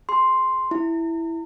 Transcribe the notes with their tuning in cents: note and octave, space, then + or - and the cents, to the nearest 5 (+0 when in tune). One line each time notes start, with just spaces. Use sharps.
G#4 +0 C6 +0
E4 +0 A#5 -40